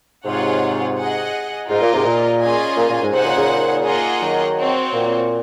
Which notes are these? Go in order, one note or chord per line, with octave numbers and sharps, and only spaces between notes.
G#2 C3 F4 G#4 C#5 F#5
G#4 D#5 F#5
G#2 F4 A#4 D#5
A#2
G#2 C3
A#2
C#4 F4 G#4 D#5 G#5
A#2
A#2
G#2
G#2 C3 D#4 G#4 C5 F#5
A#2 C#3
A#2 C#3
A#3 F4 G#4 D#5 F#5
D#3 F#3
C4 F#4 C#5
A#2